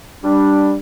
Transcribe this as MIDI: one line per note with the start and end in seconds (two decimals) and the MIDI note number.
0.24 0.77 55
0.24 0.77 62